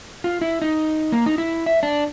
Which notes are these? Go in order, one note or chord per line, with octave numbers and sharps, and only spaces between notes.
F4
E4
D#4
A#3
D#4
E4
E5
D4